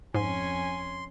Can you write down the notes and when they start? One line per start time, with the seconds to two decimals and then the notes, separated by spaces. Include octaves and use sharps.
0.14 F2 G#2 C#4 G#5 C6